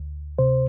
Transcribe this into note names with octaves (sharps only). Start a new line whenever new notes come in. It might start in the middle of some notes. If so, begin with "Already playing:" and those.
Already playing: D2
C3 C5